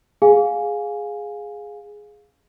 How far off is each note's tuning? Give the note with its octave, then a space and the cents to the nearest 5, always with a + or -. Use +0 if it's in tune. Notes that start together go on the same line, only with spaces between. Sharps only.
G#4 +0 F5 +15 G#5 +0